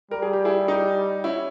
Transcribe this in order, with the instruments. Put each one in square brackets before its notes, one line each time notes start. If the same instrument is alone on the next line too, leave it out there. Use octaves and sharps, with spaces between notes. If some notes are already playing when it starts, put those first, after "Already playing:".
[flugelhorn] G3 [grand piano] A#4
[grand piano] G#4
G4
E4 G#4
D#4 G4
C#4 E4